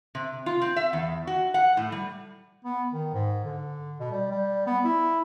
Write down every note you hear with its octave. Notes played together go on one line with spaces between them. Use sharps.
C3
F4
C4
E5
E2
F#4
F#5
A2
G3
B3
D#3
G#2
D3
B2
G3
G3
B3
E4